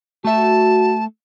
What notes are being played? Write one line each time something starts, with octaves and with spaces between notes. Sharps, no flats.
A3 F#4 E5 A5